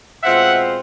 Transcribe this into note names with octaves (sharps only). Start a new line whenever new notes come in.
B2 G#3 C4 F4 E5 F#5